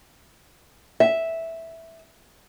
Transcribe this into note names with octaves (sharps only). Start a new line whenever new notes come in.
E5